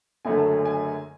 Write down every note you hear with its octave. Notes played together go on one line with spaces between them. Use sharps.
F#1 F#2 D3 F#3 A3 G#5
A5
G#5
G#5